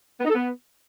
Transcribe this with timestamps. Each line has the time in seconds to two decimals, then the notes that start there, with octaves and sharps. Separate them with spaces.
0.20 B3
0.25 D#4
0.30 A4
0.35 B3